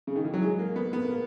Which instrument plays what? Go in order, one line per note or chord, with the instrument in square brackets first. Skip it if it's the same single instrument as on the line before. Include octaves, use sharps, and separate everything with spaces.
[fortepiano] C#3
D#3
E3
F#3
G#3
A#3
B3
B3
A#3